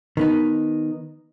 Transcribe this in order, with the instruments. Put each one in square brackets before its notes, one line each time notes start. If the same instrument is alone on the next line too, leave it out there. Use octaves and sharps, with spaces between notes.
[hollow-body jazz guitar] D#3 B3 D#4